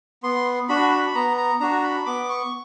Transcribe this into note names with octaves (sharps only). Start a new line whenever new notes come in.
B3 C6
D4 F#4 B5
B5
B3 A#5
A#5
D4 F#4 A#5
B5
B3 D6
C#6